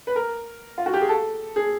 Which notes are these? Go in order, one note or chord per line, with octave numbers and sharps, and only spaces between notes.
B4
A#4
F4
F#4
G4
G#4
A4
G#4